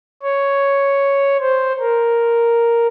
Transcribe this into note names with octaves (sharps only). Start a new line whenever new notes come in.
C#5
C5
A#4